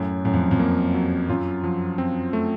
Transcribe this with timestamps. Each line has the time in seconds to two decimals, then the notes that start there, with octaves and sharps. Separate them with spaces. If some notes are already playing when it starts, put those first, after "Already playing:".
Already playing: F#2 A2
0.25 F#2 A2
0.33 F2
0.51 F2
0.59 A#3
0.94 F#3
1.29 F#2 F4
1.64 F3
1.98 C4
2.33 A3